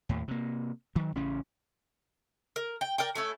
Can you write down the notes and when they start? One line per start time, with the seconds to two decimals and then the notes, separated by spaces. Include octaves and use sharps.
0.09 D#2 A2
0.28 C3 A#3
0.96 D#3 F#3
1.15 A1 C#3 C#4
2.56 A#4
2.81 G5
2.98 A#4 D5 G5
3.15 A3 C#4 E4